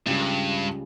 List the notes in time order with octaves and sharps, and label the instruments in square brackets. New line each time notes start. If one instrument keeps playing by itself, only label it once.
[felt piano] C#2 C#3 G3 [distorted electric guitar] G2